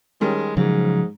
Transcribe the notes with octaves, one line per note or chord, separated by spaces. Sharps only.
D#3 G3 G#3 C#4
G#2 C#3 F3 F#3